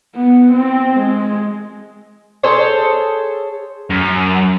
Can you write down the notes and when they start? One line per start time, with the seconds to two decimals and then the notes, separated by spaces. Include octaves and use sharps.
0.16 B3
0.53 C4
1.00 G#3
2.43 G#4 A4 C5 C#5
3.90 F#2